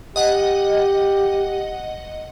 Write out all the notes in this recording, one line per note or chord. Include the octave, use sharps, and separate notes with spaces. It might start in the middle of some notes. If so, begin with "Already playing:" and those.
G4 D#5 F#5